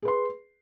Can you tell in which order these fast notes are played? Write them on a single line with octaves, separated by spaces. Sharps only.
G#4 B4 C6